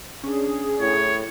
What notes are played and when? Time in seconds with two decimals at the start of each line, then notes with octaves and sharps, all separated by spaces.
0.24 C#4 D4 G#4
0.80 A2 C#5